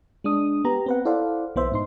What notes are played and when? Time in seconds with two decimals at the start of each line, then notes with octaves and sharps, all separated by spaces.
0.24 G#3 D4 D#6
0.64 B3 G4 A#5
0.86 C4 B4 F#5
1.05 E4 A4 C5 D5 F5 F#5
1.55 B1 E3 B3 C5 E5
1.72 G#2 D#4 C6